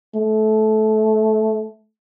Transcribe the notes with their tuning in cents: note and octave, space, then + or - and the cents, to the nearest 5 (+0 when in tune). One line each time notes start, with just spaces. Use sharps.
A3 -20